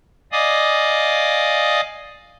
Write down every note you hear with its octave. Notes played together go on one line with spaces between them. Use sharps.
D5 D#5 F5 G#5 D6 D#6